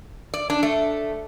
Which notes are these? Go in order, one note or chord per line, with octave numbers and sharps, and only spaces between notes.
D5
D4
A3